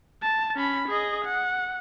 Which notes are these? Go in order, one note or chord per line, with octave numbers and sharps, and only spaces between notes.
A5
C#4 B5
G#4 D#5
F#5